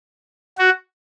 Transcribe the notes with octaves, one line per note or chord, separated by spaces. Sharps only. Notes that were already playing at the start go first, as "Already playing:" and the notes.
F#4